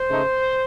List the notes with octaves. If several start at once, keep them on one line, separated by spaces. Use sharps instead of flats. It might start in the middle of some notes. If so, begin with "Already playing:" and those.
Already playing: C5
C#3 A3 D#4